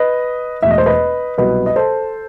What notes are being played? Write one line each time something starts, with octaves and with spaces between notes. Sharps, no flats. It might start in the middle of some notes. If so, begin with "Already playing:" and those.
Already playing: B4 D#5
E1 E2 B2 A3 E5
D#5
C5
B4 D#5
C2 B2 F#3 B3 B4 D#5
D#5
A4 C5